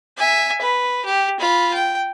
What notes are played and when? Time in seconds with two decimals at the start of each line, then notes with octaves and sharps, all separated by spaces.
0.17 E5 G#5
0.61 B4
1.06 G4
1.40 F4 B5
1.74 G5